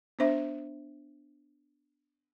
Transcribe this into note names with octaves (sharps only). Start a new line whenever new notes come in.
B3 D4 C5 E5